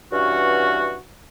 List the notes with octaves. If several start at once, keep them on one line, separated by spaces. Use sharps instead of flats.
G2 E3 C#4 F#4